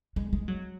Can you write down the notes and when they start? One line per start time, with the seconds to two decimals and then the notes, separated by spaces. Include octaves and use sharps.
0.16 G#3
0.33 G#3
0.48 F#3